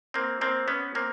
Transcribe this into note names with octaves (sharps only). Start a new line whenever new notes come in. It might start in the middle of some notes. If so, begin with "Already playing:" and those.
A#3 C4
A#3 C4
B3 C#4
A#3 C4